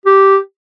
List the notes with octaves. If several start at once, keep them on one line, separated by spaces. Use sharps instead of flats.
G4